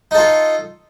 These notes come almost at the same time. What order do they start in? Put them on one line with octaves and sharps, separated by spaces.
D#4 A4 F4